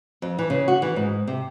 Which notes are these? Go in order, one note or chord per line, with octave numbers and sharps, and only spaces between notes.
F2
E3
C#3
F#4
E3
G#2
C3